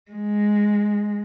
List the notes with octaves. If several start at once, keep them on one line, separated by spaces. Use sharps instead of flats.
G#3